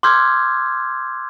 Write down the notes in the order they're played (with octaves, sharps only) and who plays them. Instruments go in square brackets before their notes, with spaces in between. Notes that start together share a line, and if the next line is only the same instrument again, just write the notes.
[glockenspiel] C6 D6 E6 F6 G6 G#6